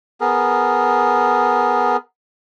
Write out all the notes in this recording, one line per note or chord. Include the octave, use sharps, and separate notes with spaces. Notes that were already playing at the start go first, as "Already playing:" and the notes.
B3 G#4 A#4